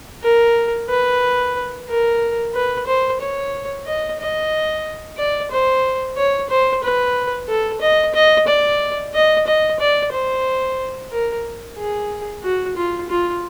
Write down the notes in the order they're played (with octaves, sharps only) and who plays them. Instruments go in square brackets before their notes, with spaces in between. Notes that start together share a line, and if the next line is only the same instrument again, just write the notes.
[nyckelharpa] A#4
B4
A#4
B4
C5
C#5
D#5
D#5
D5
C5
C#5
C5
B4
A4
D#5
D#5
D5
D#5
D#5
D5
C5
A#4
G#4
F#4
F4
F4